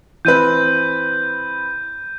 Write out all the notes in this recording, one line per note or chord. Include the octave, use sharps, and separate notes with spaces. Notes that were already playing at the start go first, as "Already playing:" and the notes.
E3 C4 B4 G6 D#7